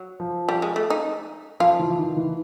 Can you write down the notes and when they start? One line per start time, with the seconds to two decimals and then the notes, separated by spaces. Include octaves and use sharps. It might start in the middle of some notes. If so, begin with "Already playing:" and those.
Already playing: F#3
0.20 F3
0.49 G3
0.62 G#3
0.76 A3
0.90 D#4
1.60 F3 F4
1.79 E3
1.98 D#3
2.17 E3